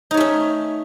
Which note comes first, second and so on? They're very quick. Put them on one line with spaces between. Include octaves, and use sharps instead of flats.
D#4 C#5 A3 C#4